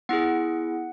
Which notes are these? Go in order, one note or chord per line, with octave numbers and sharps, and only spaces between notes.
B3 E4 G#4 F#5